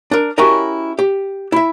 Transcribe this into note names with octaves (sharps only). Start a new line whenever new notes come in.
D4 A#4
C#4 E4 F#4 G4 A#4 D#5
G4
E4 E5